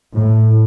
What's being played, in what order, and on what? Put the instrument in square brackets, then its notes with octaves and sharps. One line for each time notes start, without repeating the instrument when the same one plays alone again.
[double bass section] A2